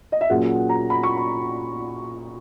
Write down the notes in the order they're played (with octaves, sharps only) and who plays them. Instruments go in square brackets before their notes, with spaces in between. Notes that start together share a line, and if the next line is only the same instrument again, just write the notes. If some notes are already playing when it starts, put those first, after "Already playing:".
[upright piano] D#5
E5
[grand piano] A#2 F#3 C#4 G#4 [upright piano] F#5
[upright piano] A#5
B5
C#6
B5